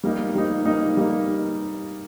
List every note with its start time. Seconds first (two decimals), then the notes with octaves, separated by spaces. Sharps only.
0.04 G3 A#3 D#4
0.35 G3 A#3 D#4
0.66 G3 A#3 D#4
0.97 G3 A#3 D#4